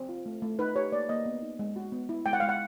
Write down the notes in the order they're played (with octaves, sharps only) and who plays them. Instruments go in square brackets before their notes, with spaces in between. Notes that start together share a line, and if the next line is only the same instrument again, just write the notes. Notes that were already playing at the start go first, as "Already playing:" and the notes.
Already playing: [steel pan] C4
F4
A3
A3
D#4 B4
G4 C#5
A#3 D5
A#3 D#5
B3
D#4
G#3
F#4
B3
E4
G#3 G5
F#5
G#3 F5
F#5